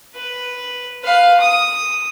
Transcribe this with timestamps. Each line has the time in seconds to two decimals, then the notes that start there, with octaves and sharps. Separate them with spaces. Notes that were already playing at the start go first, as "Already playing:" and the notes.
0.15 B4
1.03 B4 F5
1.40 D#6